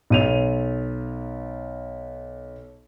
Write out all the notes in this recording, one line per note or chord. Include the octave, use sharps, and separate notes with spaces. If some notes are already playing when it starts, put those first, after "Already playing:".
B1 D#7 F7